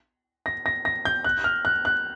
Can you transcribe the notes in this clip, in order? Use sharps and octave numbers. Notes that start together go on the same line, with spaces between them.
A#6
A#6
A#6
G6
F#6
F6
F#6
F#6